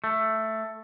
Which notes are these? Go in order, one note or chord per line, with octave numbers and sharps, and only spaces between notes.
A3